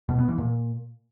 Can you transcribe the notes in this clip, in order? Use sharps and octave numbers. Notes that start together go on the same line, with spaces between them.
B2
B3
E3
A#2